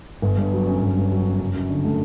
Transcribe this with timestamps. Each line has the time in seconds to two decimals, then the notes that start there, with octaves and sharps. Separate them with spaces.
0.22 G1
0.38 G2
0.52 F#3
0.67 C#4
0.82 G1
0.96 G2
1.11 F#3
1.26 C#4
1.40 F#1
1.55 F#2
1.70 D3
1.85 A3